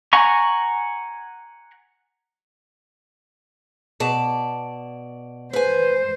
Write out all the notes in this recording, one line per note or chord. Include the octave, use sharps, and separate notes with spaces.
F#5 G#5 A#5 C#6
B2 D5 A5
B4 C5 G#5